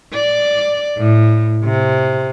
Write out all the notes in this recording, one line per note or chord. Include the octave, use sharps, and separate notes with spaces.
D5
A2
C3